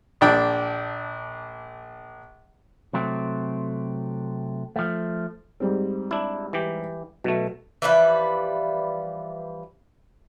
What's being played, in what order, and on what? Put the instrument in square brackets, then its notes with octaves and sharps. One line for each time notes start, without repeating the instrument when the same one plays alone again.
[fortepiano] A#1 D4 G5
[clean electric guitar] C3 F#3 A3 C4
F3 A3
[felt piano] G#2 G3 C4
[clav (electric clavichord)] D4 E4
E3 G4
[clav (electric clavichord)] B2 A3 [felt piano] F#3
[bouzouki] E3 F3 G3 B4